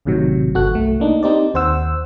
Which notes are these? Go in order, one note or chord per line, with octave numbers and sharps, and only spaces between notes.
A1 A2 C3 D#3 F#3
G1 F#4 A4 F#6
C2 A3
A#3 D4 D#4
C4 D#4 G4 C5 D5
D#2 C5 F#5 E6